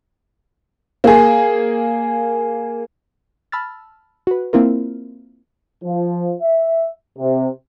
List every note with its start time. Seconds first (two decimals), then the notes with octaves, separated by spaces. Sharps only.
1.04 A#3 G#4
3.52 A5 B5 E6 F6 A6
4.27 F#4 B4
4.53 A#3 C4 E4 F4 A#4
5.84 F3
6.42 E5
7.19 C3